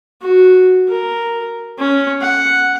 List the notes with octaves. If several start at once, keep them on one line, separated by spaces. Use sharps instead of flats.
F#4
A#4
C#4
F#5